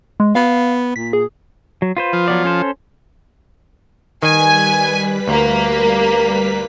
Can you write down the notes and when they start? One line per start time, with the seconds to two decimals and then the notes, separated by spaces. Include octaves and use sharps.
0.20 G#3
0.35 B3 F5
0.96 A#2 B6
1.13 G#4
1.82 F#3
1.97 F4 B4 C5
2.13 F3
2.28 F#3 B3 D5
2.45 C#4 A4 C5
4.22 D#3 G3 B4 G#5 B6
5.28 D2 A#3